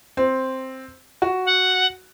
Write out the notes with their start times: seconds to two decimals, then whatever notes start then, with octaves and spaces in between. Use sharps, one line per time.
0.17 C4
1.22 F#4
1.46 F#5